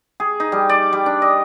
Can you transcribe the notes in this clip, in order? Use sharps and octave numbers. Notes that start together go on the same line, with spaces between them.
G#4
D#4
G3
D5
G3
D4
D#5